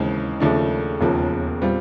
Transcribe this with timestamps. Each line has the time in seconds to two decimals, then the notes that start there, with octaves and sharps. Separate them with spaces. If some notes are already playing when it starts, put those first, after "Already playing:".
Already playing: D#2 C#3 E3 G#3 C4
0.40 D#2 C#3 F3 A3 D4
1.01 E1 D#2 C#3 F3 A#3
1.61 A#2 G3 C4 F4